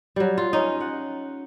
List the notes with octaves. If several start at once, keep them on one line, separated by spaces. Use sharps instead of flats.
F#3 G3
F4
C#4 D#4
F#5